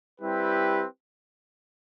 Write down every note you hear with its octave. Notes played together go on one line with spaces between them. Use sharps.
G3 C4 E4 G4 B4